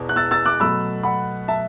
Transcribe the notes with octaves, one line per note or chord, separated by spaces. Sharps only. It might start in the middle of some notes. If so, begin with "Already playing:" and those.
Already playing: E2 B2
F#6
E6 A6
E6 A6
D6 F#6
B2 F#3 A3 B5 E6
F#5 B5
E5 A5